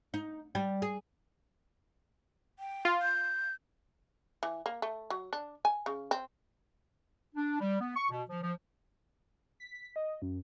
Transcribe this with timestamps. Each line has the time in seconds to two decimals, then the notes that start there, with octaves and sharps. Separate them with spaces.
0.14 D#4
0.55 G3
0.82 G#4
2.59 G5
2.85 F4
3.02 G6
4.43 E3
4.66 A#3
4.82 A3
5.10 F#3
5.33 D4
5.65 G#5
5.86 C#3
6.11 C4
7.35 D4
7.60 G3
7.80 B3
7.96 C#6
8.09 B2
8.29 F3
8.41 F3
9.60 B6
9.96 D#5
10.22 F#2